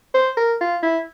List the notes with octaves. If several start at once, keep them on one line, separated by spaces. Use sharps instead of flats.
C5
A#4
F4
E4